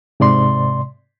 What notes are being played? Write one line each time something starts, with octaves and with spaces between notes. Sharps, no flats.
G#2 C3 D5 C6